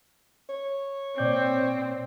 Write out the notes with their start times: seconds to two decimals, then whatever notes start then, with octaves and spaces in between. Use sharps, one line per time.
0.49 C#5
1.18 A#2 C4 D5 G6